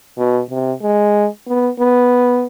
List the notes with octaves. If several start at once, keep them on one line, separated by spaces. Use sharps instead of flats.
B2
C3
G#3
B3
B3